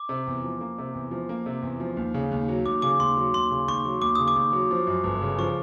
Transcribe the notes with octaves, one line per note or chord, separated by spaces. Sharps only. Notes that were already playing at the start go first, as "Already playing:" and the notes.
Already playing: D6
C3
E2
F3
A#3
C3
E2
F3
A#3
C3
E2
F3
D#2
C#3
D#2
F#3
D#2 D6
C#3 D6
D#2 C6
F#3
D#2 C6
C#3
D#2 C#6
F#3
D#2 D6
C#3 D#6
D6
D#2
F#3
F3
F#2
G1
C#3
F3 C#6